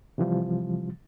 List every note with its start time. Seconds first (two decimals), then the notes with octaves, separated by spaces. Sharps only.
0.18 C3 E3 F3 G3